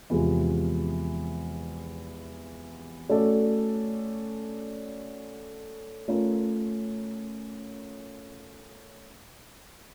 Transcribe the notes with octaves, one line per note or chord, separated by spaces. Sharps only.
E2 C3 F3 G#3
A3 C#4 F#4 A4 D5
A3 C#4 F4 A#4